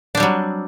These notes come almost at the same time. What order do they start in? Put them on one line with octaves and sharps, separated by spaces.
D4 C4 G3 F#3